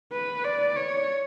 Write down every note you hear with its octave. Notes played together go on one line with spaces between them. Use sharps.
B4
D5
C#5